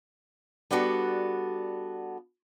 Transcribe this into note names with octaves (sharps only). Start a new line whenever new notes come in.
G3 B3 D4 F#4 A4